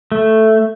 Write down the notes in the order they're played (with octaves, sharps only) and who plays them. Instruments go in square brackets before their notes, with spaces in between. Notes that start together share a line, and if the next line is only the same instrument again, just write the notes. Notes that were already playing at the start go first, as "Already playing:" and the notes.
[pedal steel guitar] A3